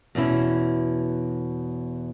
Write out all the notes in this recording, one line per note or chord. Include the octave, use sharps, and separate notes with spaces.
E2 B2 C#4 E4